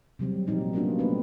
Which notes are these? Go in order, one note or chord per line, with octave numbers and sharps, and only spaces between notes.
C3 F#3 G3 C4
A#2 F3 D#4 G4
A#3 B3 C#4 D4 F4 F#4
A3 B3 C4 D4 B4